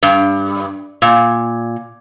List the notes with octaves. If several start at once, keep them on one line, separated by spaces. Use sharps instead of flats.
G2
A#2